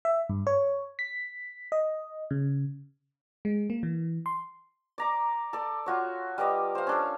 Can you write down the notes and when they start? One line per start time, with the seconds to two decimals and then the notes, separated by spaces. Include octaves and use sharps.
0.05 E5
0.29 G2
0.47 C#5
0.99 B6
1.72 D#5
2.31 C#3
3.45 G#3
3.70 A#3
3.83 E3
4.26 C6
4.98 D5 A#5 D6
5.53 A4 D5
5.86 F4 F#4 C#5
6.38 G3 B4 D5 D#5
6.75 C5 F5
6.87 C#4 D4 A4